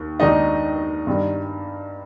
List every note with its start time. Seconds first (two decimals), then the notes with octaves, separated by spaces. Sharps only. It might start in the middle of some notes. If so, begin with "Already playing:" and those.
Already playing: D#2
0.19 D#2 D#3 G#3 D4 D#4 D#5
1.07 G2 D#3 G3